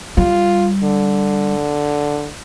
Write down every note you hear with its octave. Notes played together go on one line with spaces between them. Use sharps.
G3 F4
D3